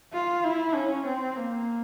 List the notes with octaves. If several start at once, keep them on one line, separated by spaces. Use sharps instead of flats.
F4
E4
C#4
C4
A#3